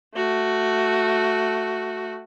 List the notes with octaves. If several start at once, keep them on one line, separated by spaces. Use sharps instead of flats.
A3 F#4